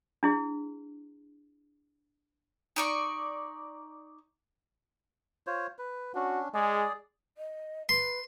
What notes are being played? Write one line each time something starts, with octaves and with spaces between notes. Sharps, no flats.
D4 E4 G#4
D#4 D5 C#6
F4 C5 C#5
B4
C#4 D4 F#4
G#3 G#4 D5
D#5
B4 C6